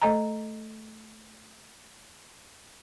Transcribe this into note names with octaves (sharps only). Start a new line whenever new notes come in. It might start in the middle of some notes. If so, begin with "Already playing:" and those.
A3 A4 D#5 G#5 A#5